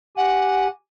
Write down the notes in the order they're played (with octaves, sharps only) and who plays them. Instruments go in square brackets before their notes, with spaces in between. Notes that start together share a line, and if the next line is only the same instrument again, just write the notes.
[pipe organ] G4 G#5 [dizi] F#5